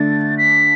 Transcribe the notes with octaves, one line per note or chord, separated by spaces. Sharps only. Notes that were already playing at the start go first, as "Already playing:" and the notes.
Already playing: D3 A3 D4 A6
B6